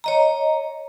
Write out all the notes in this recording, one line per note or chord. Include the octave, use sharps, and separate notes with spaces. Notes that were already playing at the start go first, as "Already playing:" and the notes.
C#5 D#5 A#5